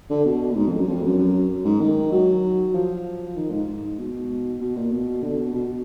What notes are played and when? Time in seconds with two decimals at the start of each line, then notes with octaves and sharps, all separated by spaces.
0.10 D3
0.25 B2
0.50 A#2
0.56 G#2
0.67 F2
0.77 F#2
0.87 F2
1.03 F#2
1.18 F#2
1.64 G#2
1.80 D#3
2.12 F#3
2.74 F3
3.36 D#3
3.51 G#2
3.67 G#2
3.99 B2
4.61 B2
4.76 A#2
4.92 B2
5.22 D3
5.38 B2
5.54 B2